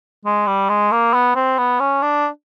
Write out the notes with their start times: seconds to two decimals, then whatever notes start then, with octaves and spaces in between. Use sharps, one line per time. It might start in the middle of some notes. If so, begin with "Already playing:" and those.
0.25 G#3
0.47 G3
0.69 G#3
0.91 A#3
1.13 B3
1.35 C4
1.58 B3
1.80 C#4
2.02 D4